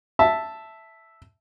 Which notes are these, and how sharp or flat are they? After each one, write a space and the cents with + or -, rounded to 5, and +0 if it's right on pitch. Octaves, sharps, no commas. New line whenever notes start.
E5 +0 A5 +0